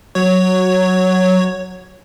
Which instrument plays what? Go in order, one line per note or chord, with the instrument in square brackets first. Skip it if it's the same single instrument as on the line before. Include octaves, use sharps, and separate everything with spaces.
[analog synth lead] F#3 [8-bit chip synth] C#5